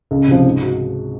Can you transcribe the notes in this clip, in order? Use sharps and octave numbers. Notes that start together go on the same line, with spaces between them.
C#2
C3 F3
G#2
F#4